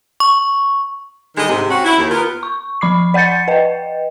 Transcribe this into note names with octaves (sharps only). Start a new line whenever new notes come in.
C#6
D3 D#3 G3 G#3 D#5
G#2 C3
C4 C#4 F#4
E4
D#2
B3 F4 A#4
C#6
F3 B5 D6 C7
D5 F#5 G6 A6 C#7
B4 D#5 G5